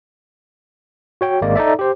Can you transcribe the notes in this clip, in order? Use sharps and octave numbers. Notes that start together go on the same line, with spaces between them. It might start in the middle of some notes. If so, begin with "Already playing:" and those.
F#4 C#5 G5
G#1 G#3 A#3 D5
D#4 A4 D5 E5
G4 C5